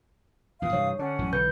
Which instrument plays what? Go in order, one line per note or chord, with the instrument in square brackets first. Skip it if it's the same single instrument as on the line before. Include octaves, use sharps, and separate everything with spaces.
[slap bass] E2 A#2 E3 [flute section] F5 D#6
[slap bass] G2 C3 E3 [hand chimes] C#5
[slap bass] D3 [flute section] C#4 D4 F#5
[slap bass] A1 F#2 A2
[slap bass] B1 D3 E3 [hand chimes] B4 G6